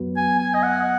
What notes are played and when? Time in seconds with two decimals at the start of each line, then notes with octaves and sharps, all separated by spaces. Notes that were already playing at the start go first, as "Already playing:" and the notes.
Already playing: F#2 F#3 B3 F#4 B4
0.16 G#5
0.39 G#5
0.54 D#5
0.63 F#5